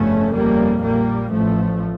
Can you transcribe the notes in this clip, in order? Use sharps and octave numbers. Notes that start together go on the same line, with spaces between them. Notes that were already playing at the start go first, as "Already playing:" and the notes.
Already playing: G1 F2 C#3 A3 C#4
G1 F2 C#3 G3 A#3
A#1 A#2 G3 A#3
A1 A2 F3 A3